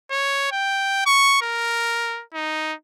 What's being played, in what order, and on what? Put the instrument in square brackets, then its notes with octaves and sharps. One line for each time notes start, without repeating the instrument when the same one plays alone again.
[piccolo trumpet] C#5
G5
C#6
A#4
D#4